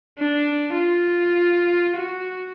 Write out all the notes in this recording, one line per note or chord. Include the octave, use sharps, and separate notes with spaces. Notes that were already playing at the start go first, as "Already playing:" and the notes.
D4
F4
F#4